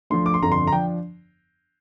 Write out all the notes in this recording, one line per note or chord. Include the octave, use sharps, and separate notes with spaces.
D2 D3 F3 C6
D6
C6
G1 F2 D3 F3 A#5
C6
A#5
F3 D4 G5